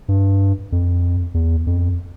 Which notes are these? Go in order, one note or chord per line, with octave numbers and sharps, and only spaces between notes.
G2
F2
E2
F2